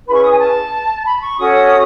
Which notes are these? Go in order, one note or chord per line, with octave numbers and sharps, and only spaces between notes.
C#4 E4 G#4 B4 B5
C#6
D#6
G#5
A5
B5
C#6
C#4 F#4 A4 C#5 D#6